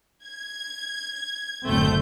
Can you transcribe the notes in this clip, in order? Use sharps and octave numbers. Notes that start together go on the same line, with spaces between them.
G#6
F#1 D2 A2 A3 C4 G6